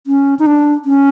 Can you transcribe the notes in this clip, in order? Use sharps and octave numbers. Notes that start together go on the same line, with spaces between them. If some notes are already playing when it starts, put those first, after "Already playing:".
C#4
D#4
D4
C#4